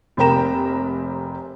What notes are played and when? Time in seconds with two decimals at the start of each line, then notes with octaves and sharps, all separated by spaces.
0.17 F1 C3 A#3 G5 A#5 E7